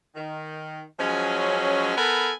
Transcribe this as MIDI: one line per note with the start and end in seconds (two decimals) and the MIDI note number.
0.15 0.82 51
0.99 1.93 53
0.99 1.93 54
0.99 1.93 56
0.99 1.93 61
1.97 2.31 59
1.97 2.31 69
1.97 2.31 70
1.97 2.31 80
1.97 2.31 83